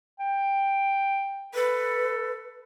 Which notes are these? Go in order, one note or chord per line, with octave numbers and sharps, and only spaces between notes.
G5
A4 B4